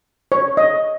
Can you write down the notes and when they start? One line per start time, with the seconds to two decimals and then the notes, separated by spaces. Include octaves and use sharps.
0.32 C#5
0.57 D#5